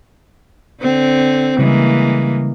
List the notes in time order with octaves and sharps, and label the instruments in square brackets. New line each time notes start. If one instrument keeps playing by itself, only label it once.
[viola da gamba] D3 C4
[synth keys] C#3 G3 [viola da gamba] E3 G#3 A#3